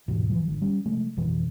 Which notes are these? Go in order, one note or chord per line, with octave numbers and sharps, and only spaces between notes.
D#2 G#2 B2 E3
E3 F3 G#3
G#1 D3
G3 C#4
C3 F3 G#3 A3
A1 F2 B2 E3